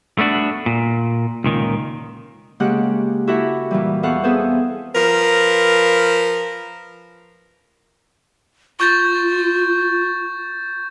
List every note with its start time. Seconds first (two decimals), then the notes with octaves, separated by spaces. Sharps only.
0.19 A3 B3 D4 F#4
0.66 A#2
1.44 C#2 A#2 D#3
2.60 C#3 G#3 A#3 G4 F#5 F#6
3.27 E4 F#4 G4 A4 E5 F#5
3.71 A#2 E3 G3
4.03 E2 A4 F5 F#5 C#6
4.24 B3 C4 G#4 A4 B4 C5
4.95 F3 A#4 B4
8.80 F4 C#6 G6 A6